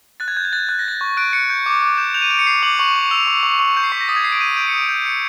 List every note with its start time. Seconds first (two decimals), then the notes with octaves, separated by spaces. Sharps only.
0.20 F#6 A6
0.28 G#6
0.36 F#6 G6
0.45 G#6
0.53 F#6 A6
0.69 F#6 A6
0.79 A#6
0.85 F#6 A6
1.01 C#6
1.17 F#6 D7
1.33 F#6 C#7
1.50 G6
1.66 D6
1.82 D6
1.98 G6 E7
2.14 G6 F7
2.22 D#7
2.30 G6 D7
2.39 C#7
2.47 G6 C7
2.63 D6 F#7
2.74 F7
2.79 C#6 F#7
2.96 C#6 F7
3.11 E6 F7
3.27 C#6
3.43 C#6
3.59 C#6
3.77 G6 C#7
3.84 C7
3.92 C#6 B6
4.01 A#6
4.08 D#6 A6
4.16 G#6
4.24 D#6 C7
4.32 D7
4.41 G6 D#7
4.56 G6 D7
4.68 C#7
4.73 D#6 D7
4.89 G6
5.06 G6 C#7